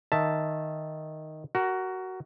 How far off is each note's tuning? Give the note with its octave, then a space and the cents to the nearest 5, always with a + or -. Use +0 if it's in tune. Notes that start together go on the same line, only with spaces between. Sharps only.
D#3 +0 E5 +0 A5 +0
F#4 +15 A#4 -5